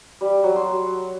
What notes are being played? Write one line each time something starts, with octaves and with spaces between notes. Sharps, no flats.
G3
F#3
C6